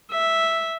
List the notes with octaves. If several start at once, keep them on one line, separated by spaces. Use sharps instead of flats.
E5